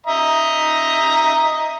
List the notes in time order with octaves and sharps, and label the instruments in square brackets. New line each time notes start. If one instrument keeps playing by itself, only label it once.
[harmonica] D#5 E5 A#5